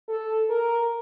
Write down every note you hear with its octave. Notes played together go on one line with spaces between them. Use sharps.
A4
A#4